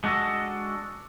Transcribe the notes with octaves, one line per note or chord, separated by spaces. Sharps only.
G#3 D4 F#4 A4 D#5